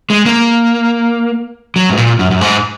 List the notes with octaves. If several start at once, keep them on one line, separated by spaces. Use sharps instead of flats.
G#3
A#3
F#3
G#2
A#2
F#2
F#2
G#2